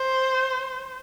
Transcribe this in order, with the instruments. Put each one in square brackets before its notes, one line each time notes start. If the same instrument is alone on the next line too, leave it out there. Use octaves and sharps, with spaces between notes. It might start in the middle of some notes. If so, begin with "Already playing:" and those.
Already playing: [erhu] C5